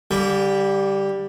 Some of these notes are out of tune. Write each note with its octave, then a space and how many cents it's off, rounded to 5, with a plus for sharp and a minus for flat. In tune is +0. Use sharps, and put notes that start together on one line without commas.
D3 -30 G3 +0